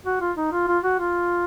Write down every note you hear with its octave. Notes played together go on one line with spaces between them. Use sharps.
F#4
F4
D#4
F4
F4
F#4
F4